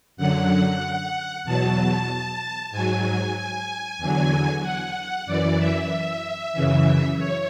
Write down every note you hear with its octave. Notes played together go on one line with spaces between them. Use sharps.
F#2 D3 F#3 F#5
E2 B2 F#3 A5
G#2 F#3 G#5
G#5
E2 D3 F#3
F#5
F#2 E3 D5
E5
E5
F#2 C#3 E3
C#5